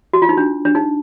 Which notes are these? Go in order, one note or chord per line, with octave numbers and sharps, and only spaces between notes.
F#4
F4
D#4
D4
D4
D#4